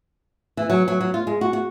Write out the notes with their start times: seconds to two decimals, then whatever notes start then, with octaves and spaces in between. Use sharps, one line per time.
0.57 E3
0.70 F#3
0.88 F#3
1.01 F#3
1.14 F4
1.27 G#3
1.41 F#4
1.53 F#4